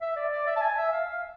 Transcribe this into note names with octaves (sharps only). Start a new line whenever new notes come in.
E5
D5
D5
E5
A5
G#5
E5
F5
F5